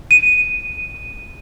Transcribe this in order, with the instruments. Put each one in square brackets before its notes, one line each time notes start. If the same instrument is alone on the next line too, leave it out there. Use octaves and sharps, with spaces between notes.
[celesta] D#7